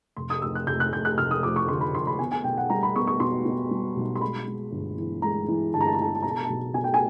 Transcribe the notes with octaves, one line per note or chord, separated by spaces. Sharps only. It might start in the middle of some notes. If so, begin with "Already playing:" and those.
F1 C6
D#6
F1 E6
F#6
F1 G6
F#6
F1 G6
F#6
F1 F6
D#6
F2 D6
C#6
D3 C6
B5
F2 C6
B5
B3 G#5
G#5
B1 G5
F#5
G3 A#5
B5
B3 C#6
C#6
B2 C6
B2
G3
B1
C6
G#3 B5
G#3
G1
E3
G#3 A#5
E3
G1 A5
A#5
A5
A#5
E3 A5
A#5
A5
B2 A#5
A5
A#5
B1 A5
B2 G#5
G5
G#5